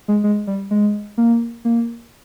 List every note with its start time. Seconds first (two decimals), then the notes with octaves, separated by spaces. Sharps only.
0.08 G#3
0.24 G#3
0.47 G3
0.71 G#3
1.18 A#3
1.65 A#3